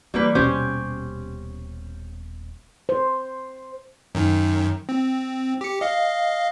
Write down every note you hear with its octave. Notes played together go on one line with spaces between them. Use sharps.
E3 G3 A#3 B4
D#1 B2 C#4 G4 C5
C5
F#2 D#3
C4
G4 C#7
D#5 F5